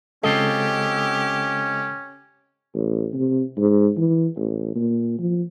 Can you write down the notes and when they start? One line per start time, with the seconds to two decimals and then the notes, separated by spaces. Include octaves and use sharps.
0.24 C#3 G#3 C4 C#4 F4 G4 A4 D#5
2.75 A1
3.14 C3
3.57 G#2
3.97 E3
4.37 A1
4.75 A#2
5.19 F3